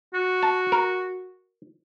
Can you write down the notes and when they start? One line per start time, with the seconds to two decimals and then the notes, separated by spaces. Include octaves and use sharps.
0.14 F#4
0.43 A5
0.72 A#4